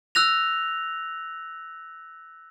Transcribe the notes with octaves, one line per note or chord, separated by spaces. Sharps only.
E6 F#6 A#6 F7